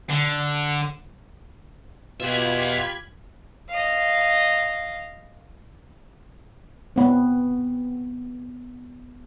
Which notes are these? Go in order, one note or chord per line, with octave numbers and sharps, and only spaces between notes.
D3
B2 F4 G4 E5 F#5 B5 G#6
D#5 F5
B3 C4